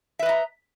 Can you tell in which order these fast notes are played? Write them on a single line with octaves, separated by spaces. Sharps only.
E5 B4 D#5 A#5